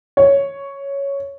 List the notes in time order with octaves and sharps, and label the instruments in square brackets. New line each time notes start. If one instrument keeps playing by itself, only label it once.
[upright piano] C#5